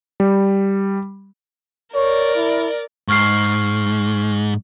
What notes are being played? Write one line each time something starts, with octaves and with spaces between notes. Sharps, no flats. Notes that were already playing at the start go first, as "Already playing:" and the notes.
G3
A#4 C#5 D5
E4
G#2 C#6 F6 C7